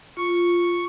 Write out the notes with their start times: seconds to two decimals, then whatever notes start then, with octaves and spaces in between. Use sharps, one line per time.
0.17 F4 C#6